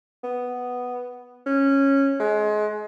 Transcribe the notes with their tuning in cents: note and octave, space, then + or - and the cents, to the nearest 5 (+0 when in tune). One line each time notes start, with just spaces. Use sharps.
B3 +0
C#4 -10
G#3 +30